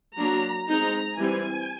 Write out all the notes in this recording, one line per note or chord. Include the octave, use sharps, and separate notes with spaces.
F#3 A#3 D4 A#5
G#3 C4 D#4 A#5
E3 G3 C4 G#5